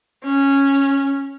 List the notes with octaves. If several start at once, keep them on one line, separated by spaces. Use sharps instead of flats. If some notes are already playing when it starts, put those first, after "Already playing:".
C#4